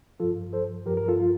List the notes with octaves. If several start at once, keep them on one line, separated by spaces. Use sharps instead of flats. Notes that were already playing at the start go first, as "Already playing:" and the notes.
G2 F3 F4 A4
A4 C5
G2 F3 G4 A#4
A#4
F4 A4
F4